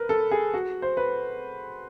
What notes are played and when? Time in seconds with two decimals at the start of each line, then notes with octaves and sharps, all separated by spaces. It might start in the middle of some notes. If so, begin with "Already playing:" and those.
Already playing: A#4 B4
0.09 A4
0.31 G#4
0.54 F#4
0.82 C5
0.97 B4